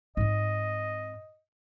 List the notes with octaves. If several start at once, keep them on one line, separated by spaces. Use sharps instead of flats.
G#2 C4 D#5